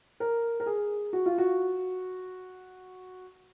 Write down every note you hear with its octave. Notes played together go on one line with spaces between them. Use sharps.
A#4
A#4
G#4
F#4
F4
F#4